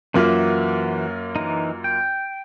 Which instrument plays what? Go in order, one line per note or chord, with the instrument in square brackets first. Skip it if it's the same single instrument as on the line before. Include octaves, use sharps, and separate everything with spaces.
[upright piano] F#2 A#3 F4 [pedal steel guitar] E3 F#4 E5
[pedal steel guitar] E3 D#4
G5